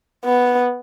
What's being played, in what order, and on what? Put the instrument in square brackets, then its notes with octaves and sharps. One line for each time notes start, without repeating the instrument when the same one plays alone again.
[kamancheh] B3